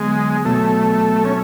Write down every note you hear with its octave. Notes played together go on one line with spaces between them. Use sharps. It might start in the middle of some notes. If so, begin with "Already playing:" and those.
Already playing: D3 F#3 G#3 B3
B2 F#3 A3 B3 F#4 A4
C#4